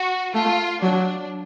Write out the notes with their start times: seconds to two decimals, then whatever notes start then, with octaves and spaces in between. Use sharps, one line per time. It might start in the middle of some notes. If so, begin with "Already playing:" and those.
Already playing: F#4
0.34 A3 F4
0.82 F#3 D4